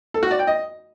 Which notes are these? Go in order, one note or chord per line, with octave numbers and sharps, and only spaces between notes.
A4
F#4
D5
G5
D#5